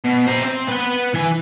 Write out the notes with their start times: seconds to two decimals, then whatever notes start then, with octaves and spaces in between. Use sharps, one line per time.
0.04 B2
0.27 C5 A#5
0.43 C4
0.68 B4 F#5
1.14 E3 G#5